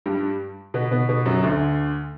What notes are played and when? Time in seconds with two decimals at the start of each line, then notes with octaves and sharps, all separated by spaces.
0.06 G2 G3
0.74 B2 B3
0.91 B2 B3
1.09 B2 B3
1.25 F#2 F#3
1.43 D2 D3